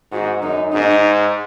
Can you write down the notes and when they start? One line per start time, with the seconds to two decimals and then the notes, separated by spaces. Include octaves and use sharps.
0.11 G#2 F#4
0.42 F#2 D#4
0.72 G#2 D#4